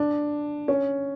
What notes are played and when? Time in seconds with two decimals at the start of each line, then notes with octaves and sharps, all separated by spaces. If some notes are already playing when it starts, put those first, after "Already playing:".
Already playing: D4
0.68 C#4